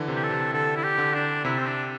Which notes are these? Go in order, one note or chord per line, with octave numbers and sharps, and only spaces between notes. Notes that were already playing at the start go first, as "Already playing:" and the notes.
Already playing: D3 E3
C3
G4
A4
C3
D3 A4
E4
G4
D3
D4
C3 E4
C4
D4